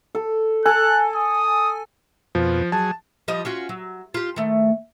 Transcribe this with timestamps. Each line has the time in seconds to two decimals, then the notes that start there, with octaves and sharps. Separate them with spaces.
0.15 A4
0.66 A4 G#5 F#6
1.16 D#6
2.35 F2 B2 F3
2.72 F#3 G#4 A5
3.28 F3 G3 D#5
3.45 C#4 F4 F#4
3.69 F#3
4.14 F4 G4
4.36 D#3 A3